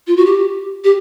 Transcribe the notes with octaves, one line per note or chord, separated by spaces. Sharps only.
F4
F#4
G4
G4